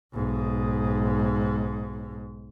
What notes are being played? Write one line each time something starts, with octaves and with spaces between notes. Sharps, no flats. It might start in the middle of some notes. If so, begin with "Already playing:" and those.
B1 G#2